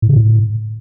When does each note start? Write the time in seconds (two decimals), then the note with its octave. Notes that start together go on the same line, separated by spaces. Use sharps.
0.02 A2
0.09 C#3
0.16 A2